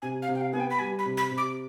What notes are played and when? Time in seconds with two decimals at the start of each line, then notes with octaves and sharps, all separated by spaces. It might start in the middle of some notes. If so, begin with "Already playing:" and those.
0.02 C3 G#5
0.22 F5
0.29 C3
0.35 G5
0.41 F5
0.53 B3 G#5
0.60 G5
0.70 B5
0.79 G3 G#5
0.99 B5
1.05 C3
1.17 B5
1.31 C3
1.38 D6